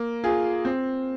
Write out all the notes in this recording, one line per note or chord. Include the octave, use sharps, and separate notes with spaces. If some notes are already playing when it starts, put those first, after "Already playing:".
Already playing: A#3
F4 G#4
C4